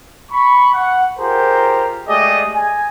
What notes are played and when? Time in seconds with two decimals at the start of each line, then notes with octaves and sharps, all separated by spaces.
0.31 B5 C#6
0.74 F#5
1.19 F4 G4 G#4 A#4 C5 A#5
2.08 G#3 A3 G4 G#4 D5 D#5
2.54 G#5